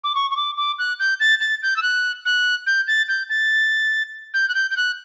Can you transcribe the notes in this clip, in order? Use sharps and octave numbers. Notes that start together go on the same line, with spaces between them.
D6
C#6
C#6
D6
D6
F#6
G6
A6
A6
G6
E6
F#6
F#6
G6
A6
G6
A6
G6
F#6
G6
G6
F#6